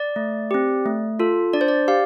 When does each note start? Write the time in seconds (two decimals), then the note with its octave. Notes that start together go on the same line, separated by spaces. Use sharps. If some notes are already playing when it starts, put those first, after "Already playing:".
Already playing: D5
0.16 A3
0.51 C4 G4
0.86 A3
1.19 F4 A4
1.53 D4 D5
1.61 C5
1.68 D5
1.88 G4 F5